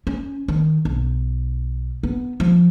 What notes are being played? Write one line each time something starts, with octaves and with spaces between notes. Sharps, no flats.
C#4
D#3
B1
B3
F3